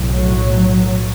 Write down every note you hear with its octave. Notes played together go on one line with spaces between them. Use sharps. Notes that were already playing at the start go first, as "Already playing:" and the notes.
Already playing: B1 A2
F#3